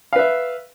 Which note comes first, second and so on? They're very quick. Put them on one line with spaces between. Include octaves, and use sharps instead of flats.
F5 B4 E5